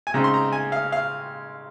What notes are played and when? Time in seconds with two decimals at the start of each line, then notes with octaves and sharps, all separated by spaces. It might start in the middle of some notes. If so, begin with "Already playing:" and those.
0.07 G#5
0.14 C#3 G#3 C4 D#4 A#5
0.24 C6
0.34 A#5
0.52 G#5
0.72 F5
0.92 F5